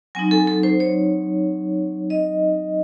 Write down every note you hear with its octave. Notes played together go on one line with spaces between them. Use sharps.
F#3 C4 D#4 G#5
A4
A4
C5
C#5
D#5